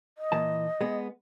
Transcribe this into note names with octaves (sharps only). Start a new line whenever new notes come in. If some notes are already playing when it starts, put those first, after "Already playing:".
D#5
A#2 E3 A5
G#3 B3